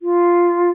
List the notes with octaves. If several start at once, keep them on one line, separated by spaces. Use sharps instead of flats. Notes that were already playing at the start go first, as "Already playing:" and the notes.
F4